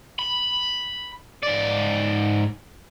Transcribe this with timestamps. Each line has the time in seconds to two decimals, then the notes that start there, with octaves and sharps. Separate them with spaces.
0.19 B5
1.43 G#2 D5